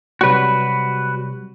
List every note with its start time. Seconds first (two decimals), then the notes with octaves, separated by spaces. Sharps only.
0.21 C3 F#3 G3 F#4 B4